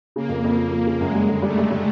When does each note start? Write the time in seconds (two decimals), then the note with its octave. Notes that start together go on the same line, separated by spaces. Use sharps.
0.16 C#3 A#3
0.29 F2
0.44 F2
0.57 F3 A#3
0.72 F3
0.87 C#3
1.00 F#2 G#3
1.14 G3
1.28 D3
1.42 G3 A3
1.58 G3
1.71 G3